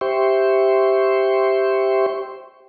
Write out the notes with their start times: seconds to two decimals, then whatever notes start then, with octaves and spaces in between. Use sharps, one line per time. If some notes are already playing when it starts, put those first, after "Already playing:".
0.01 G4 C5 E5 G5 C6 C#6